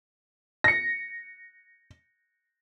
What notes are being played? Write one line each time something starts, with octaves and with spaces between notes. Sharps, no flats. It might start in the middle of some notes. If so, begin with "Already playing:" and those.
A#6 C#7